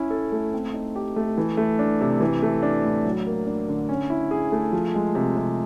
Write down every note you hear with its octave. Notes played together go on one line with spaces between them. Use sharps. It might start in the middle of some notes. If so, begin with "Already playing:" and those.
Already playing: C#4 E4
A4
A3
C4
D#4
G4
A3
E3
A3
D4
C3
E3
A3
D4
A2
F#3
A#3
D4
D3
C#4
E4
G#4
A3
F3
G#3
C3
C3